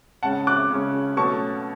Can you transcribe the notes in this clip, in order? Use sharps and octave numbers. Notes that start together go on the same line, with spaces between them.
C#3 G#3 C#4 F#5 A5
D6 F#6
C#3 G#3 C#4
B2 F#3 A3 C#4 A5 C#6